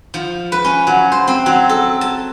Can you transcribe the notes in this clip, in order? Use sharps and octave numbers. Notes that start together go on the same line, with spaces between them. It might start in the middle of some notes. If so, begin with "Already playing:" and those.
F3
B4
C#4
F#3
C5
C4
F#3
A4
A5